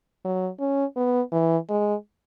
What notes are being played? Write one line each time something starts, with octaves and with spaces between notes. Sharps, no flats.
F#3
C#4
B3
E3
G#3